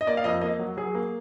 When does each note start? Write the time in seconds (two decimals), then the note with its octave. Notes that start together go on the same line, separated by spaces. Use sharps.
0.01 D#5
0.07 A#3 D5
0.17 F5
0.24 F2 D#5
0.41 A#3 D#5
0.59 F#3
0.77 F#3 G#4
0.95 A#3